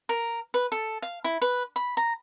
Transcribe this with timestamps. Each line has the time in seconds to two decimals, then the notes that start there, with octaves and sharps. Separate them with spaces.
0.09 A#4
0.54 B4
0.72 A4
1.02 F5
1.24 E4
1.42 B4
1.76 B5
1.97 A#5